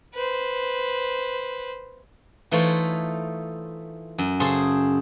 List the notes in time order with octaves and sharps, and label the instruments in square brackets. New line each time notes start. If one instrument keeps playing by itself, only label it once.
[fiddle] B4 C5
[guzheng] E3 A3 D#4 F4 C5 C#5
F#2
C#3 G#4 A4 C5 C6